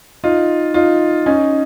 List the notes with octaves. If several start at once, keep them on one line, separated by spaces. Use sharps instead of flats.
D#4 F4
D#4 F4
C#4 D#4